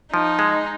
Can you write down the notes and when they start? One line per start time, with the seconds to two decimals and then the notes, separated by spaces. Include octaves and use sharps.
0.13 F3 D#4
0.39 G#3